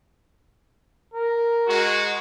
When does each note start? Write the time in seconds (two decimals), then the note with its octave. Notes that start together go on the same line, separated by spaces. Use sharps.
1.14 A#4
1.67 G#3 F#4